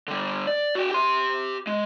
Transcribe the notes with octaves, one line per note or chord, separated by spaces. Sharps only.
D3 G3
D5
F#4 G5
G4 C6
G#3